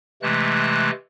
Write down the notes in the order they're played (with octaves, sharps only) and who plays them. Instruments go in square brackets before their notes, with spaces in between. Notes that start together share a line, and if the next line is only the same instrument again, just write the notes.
[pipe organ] C3 E3 G#3 A3 F#6